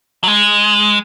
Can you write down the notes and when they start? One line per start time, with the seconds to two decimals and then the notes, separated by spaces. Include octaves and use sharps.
0.24 F#3
0.28 G#3